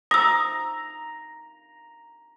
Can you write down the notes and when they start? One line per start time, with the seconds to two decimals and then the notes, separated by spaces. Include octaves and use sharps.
0.11 A#5 D#6 E6